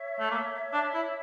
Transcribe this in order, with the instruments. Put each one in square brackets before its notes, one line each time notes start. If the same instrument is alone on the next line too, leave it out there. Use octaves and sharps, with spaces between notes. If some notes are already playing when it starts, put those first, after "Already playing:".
Already playing: [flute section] C#5 E5
[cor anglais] A3
A#3
D4
E4